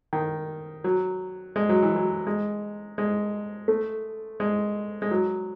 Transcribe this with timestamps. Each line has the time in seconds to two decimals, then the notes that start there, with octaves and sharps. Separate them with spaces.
0.13 D#3
0.84 F#3
1.56 G#3
1.69 F#3
1.82 E3
1.96 F#3
2.27 G#3
2.98 G#3
3.68 A3
4.40 G#3
5.02 G#3
5.11 F#3